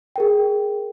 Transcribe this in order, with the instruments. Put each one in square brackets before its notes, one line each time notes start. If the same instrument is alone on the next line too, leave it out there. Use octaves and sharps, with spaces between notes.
[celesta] G#4 A#4 G5